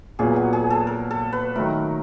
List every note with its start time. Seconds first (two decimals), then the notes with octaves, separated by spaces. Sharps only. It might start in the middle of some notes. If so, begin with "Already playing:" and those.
0.19 A#2 F#3 B3 G#4
0.36 F#4
0.53 G#4
0.70 A4
0.87 A#4
1.11 A4
1.33 B4
1.56 D#3 F#3 A3 A#4